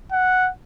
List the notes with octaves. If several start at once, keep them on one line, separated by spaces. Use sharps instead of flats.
F#5